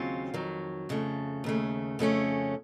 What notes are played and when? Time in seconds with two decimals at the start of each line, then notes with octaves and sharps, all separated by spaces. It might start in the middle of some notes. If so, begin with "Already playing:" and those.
Already playing: D#2 C#3 F#3 C4 F4
0.34 F2 D#3 F#3
0.89 F2 C#3 A3
1.44 D#2 C#3 A3
1.99 F2 C#3 A3 C#4